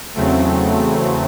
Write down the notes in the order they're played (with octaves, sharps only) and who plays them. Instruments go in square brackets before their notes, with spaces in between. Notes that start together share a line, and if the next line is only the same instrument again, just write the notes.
[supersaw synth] E2 C#3 F#3 A3 C4